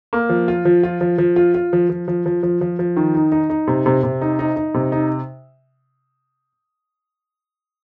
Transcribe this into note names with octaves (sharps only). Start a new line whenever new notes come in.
A#3
F3
F4
F3
F4
F3
F3
F4
F4
F3
F3
F3
F3
F3
F3
F3
D#3
D#4
D#4
D#4
C3
C3
C3
D#4
D#4
D#4
C3
D#4